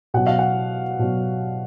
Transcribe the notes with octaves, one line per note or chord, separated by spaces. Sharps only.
B2 F#3 F#5
F5
F#5
B2 F#3